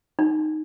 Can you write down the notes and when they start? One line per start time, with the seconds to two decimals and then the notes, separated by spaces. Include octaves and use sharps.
0.19 D#4